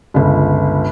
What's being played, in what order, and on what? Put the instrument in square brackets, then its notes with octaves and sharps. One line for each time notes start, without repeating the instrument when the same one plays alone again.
[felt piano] G1 C#2